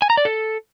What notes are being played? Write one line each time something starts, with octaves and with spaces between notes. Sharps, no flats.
G#5
A#5
D5
A4